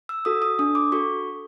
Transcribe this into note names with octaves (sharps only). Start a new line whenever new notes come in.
E6
F#4 A4 D#6
D#6
D4 D#6
D6
F#4 A4 C#6